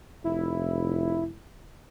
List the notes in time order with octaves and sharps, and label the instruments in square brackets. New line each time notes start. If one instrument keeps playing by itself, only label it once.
[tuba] F1 [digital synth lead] E4